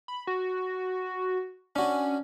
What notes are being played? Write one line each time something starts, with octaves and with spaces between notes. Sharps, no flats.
B5
F#4
C#4 D4 F#4